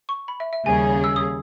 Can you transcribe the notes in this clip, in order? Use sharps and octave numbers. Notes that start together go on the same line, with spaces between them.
C#6
B5
E5
E5
D#2 C#3 G3 C#4 G#4 G#5
E6
D#6